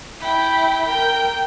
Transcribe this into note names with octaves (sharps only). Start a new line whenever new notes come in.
E4 G5
A#4 G5